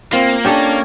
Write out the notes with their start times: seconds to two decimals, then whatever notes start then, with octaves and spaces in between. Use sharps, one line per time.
0.13 A#3 C4 F4
0.45 C#4 D4 G4 A4